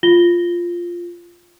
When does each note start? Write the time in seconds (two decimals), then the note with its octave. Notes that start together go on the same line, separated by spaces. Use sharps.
0.03 F4 A#6 G7